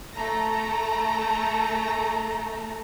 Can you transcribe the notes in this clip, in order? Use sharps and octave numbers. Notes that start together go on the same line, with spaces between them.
A3 A4 A#5